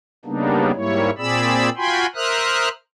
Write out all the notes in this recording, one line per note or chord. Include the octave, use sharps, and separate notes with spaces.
C#3 G3 A#3 B3 D4 D#4
G#2 G3 A#3 E4 C#5
A#2 C4 G#4 D5 B5 E6
F4 F#4 G5 G#5 B5 C6
A#4 C5 E5 D#6 F6 F#6